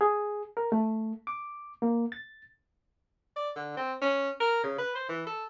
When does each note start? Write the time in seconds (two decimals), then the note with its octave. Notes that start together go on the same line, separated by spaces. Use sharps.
0.01 G#4
0.57 A#4
0.72 A3
1.27 D6
1.82 A#3
2.12 A6
3.36 D5
3.56 D3
3.77 C4
4.02 C#4
4.40 A#4
4.64 C#3
4.78 B4
4.95 C5
5.09 E3
5.27 A4